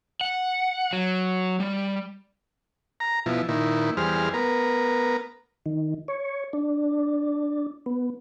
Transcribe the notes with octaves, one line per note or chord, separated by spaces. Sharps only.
F#5
F#3
G3
A#5
B2 F3 E4
A#2 D#3 E4
E2 G3 G#4 C5 F6
B3 A#4
D#3
C#5
D4
B3